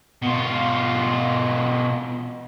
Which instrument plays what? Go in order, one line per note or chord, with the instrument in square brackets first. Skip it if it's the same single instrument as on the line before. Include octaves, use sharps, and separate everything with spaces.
[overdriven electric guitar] B2 F4